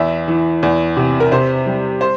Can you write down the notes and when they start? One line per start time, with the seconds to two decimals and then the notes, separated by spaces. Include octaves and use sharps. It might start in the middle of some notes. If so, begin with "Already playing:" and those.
Already playing: E2 E5
0.28 E3
0.63 E2
0.97 C3
1.20 A#4
1.32 C3 C5
1.66 G3
2.01 C5